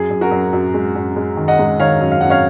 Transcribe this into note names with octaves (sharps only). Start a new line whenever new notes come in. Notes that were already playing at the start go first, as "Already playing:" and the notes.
Already playing: F#2 G#4
F#2
F#4 A#4
F#2
F#2
G#3
F#2
G#3
D#3
D#5 F#5
G#3
D#3 C#5 F5
F#2
F5
F#2 F#5
C#5 F5